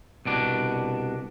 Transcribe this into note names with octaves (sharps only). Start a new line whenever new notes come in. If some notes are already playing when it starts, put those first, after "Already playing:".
C2 B2 D4